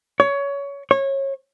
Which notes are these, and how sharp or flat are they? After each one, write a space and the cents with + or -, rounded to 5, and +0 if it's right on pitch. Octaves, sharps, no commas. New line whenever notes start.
C#5 +20
C#5 -25